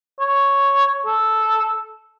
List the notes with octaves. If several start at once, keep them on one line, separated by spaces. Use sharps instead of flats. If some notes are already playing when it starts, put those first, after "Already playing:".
C#5
A4